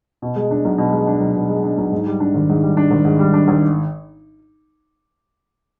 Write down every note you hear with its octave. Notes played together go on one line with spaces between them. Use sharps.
B2
G#3
D4
B1
B2
G#3
D4
B1
B2
G#3
D4
B1
G#2
G3
D4
G#1
G#2
G3
D4
G#1
G#2
G3
D4
G#1